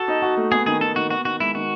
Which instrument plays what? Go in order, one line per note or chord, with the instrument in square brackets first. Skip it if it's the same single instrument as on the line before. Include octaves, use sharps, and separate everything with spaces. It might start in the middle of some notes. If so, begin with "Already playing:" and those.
Already playing: [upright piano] F#4 [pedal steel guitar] A4
[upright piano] D#4
F#4
A3
[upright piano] B3 [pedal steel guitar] G#4
[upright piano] D#3 [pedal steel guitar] G#4
[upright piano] D#3 [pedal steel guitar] A4
[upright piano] D#3 [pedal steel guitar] F#4
[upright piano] B3 [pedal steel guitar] F#4
[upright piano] D#3 [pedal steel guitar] F#4
[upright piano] G#3 [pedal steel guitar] E4
[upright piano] D#3 [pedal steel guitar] F#4